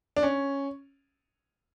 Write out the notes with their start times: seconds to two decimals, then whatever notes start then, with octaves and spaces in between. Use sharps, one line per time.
0.16 D4
0.23 C#4